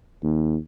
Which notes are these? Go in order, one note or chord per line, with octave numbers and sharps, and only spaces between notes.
D#2